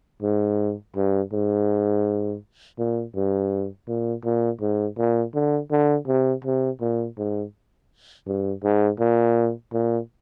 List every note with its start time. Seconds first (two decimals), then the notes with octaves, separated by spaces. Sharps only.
0.22 G#2
0.96 G2
1.33 G#2
2.79 A#2
3.15 G2
3.88 A#2
4.25 A#2
4.61 G#2
4.98 A#2
5.35 D3
5.71 D3
6.08 C3
6.44 C3
6.81 A#2
7.18 G#2
8.27 G2
8.64 G#2
9.00 A#2
9.73 A#2